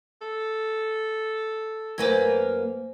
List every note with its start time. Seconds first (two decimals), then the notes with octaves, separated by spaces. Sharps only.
0.21 A4
1.98 F#2 A#3 B4 C5 G#5 G#6